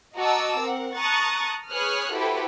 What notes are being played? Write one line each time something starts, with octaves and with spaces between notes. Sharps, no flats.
F#4 D#5 A5 A#5 D6 E6
C4 A#4 F#5
A5 A#5 C#6 D#6 F#6 A6
G#4 B4 C#5 D#6 F6 F#6
E4 F#4 G4 A4 B4 C5